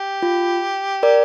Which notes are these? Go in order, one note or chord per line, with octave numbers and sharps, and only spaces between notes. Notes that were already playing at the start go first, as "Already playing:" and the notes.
Already playing: G4
F4
A#4 D5